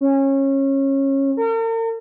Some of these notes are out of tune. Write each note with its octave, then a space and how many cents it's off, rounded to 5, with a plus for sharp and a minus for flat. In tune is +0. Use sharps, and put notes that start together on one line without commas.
C#4 -25
A#4 -45